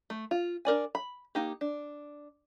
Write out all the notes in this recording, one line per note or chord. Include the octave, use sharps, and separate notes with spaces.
A3
F4
D4 A#4 D5 G#5
B5
A#3 D#4 G4
D4